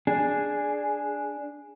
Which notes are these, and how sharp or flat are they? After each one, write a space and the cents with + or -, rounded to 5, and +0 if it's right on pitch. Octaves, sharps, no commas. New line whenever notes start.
D4 +0 G#4 +0